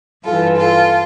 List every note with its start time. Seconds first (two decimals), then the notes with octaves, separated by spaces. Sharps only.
0.25 G2 E3 F4 A4
0.56 F4 A4